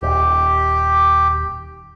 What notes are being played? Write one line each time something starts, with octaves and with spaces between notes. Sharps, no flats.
D#1 G4